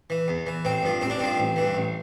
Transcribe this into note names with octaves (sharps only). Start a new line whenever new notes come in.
E3
E2
E3
A1 C4
G2 F3
A1 C4
D4
G2 F3 C4
A1
G2 E3
A1